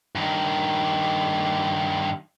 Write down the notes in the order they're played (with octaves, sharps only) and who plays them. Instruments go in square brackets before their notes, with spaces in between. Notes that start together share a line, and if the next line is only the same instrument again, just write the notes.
[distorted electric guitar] G2 D#3